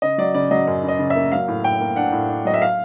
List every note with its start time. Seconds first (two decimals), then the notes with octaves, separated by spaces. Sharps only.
0.02 C#3 D#5
0.18 F#3 D5
0.34 C#3 D5
0.51 F#3 D#5
0.67 F#2
0.83 C#3
0.88 D#5
0.99 C#3
1.10 E5
1.16 A#3
1.32 F#3 F5
1.48 A2
1.64 A2 G5
1.81 A#3
1.96 D4 F#5
2.12 A2
2.29 D4
2.45 F#3 D#5
2.54 E5
2.62 F5